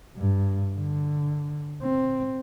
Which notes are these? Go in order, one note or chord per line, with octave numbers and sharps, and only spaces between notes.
G2
D3
C4